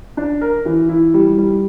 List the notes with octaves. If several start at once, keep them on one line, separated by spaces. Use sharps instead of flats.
D4
A#4
E3
E4
G3
G3